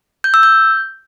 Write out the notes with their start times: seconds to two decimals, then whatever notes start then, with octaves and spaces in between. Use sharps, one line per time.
0.24 G6
0.34 E6
0.43 G6